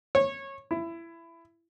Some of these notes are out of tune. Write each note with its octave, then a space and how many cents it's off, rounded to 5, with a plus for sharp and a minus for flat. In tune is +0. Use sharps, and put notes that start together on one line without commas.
C#5 -20
E4 +20